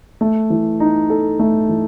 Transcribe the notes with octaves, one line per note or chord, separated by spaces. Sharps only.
A3
E3
D#4
A4
A3
E3